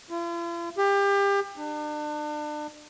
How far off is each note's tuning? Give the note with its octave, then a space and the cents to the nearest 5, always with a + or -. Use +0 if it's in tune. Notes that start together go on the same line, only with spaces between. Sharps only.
F4 -45
G4 +30
D4 +35